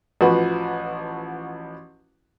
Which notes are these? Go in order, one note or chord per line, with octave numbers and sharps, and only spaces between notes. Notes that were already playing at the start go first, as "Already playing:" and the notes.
A1 F3 F#4 B4